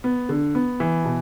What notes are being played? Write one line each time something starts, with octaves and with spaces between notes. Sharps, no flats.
B3
D3
B3
E3
B2